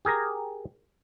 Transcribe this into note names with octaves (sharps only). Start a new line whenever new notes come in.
G4 G#4 A#4 A#5